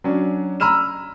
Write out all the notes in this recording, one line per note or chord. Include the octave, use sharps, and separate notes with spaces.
F#3 C#4 D4
A#5 B5 E6 F6 D#7 E7